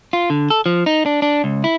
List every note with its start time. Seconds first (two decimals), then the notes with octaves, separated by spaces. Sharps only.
0.13 F4
0.30 D3
0.50 A4
0.66 F3
0.86 D#4
1.06 D4
1.22 D4
1.44 C#2
1.64 E4